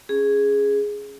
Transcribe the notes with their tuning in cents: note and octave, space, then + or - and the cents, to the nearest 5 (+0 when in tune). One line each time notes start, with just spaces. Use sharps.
C#4 +0 G#4 +0